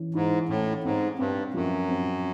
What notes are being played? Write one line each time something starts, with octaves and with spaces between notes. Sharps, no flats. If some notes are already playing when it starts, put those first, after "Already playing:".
Already playing: E3 C#4
G#2 E4
A2 C#4
G#2 C4
G2 C4
F#2 F3
C4